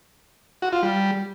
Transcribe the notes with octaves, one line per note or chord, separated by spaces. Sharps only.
F#4
F4
G3